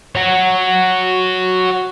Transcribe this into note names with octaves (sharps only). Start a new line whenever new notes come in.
F#4 C#5